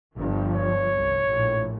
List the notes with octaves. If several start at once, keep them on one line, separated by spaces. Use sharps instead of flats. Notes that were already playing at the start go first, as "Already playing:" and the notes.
G1 G2 F3
C#5
C2
A#1 A2